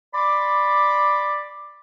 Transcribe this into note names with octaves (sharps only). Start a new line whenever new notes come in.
D5 B5 C6 D6